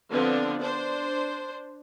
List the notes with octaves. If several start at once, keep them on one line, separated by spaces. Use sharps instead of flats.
D3 F3 B3 C4 D4
D4 C5